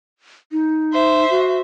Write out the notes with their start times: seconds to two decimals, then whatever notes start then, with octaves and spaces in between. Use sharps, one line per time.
0.52 D#4
0.93 C5 E5
1.30 F#4